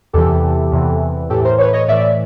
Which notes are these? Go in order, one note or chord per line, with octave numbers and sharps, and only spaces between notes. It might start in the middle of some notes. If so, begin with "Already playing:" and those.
E2 C3 E3 G4 A4
E2 C3 E3
A2 E3 G4 A4
A#4 C5
B4 C#5
C#5 D#5
A2 E3 D5 E5